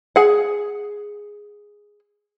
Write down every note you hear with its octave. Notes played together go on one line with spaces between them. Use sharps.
G#4 F#5